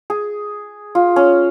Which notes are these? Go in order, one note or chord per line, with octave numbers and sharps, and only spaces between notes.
G#4
F4
C#4